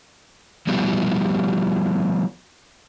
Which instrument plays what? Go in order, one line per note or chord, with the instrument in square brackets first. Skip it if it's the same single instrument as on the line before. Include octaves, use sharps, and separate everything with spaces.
[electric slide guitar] F3 G3 B3 E4 F#4 G4